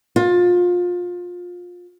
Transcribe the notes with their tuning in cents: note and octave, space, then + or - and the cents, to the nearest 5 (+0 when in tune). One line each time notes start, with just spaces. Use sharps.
F4 +25